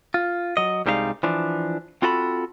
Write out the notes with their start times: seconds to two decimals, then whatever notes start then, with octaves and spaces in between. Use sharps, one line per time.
0.14 F4
0.57 F#3 D#5
0.86 C2 G3 G#3 D#4 E5 F5
1.23 E3 F3 D4
2.02 C4 F4 F#4 A4 F5 B5